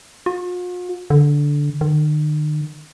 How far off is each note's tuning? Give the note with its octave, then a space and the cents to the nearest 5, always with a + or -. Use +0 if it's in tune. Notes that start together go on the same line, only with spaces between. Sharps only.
F4 +45
D3 -10
D#3 -45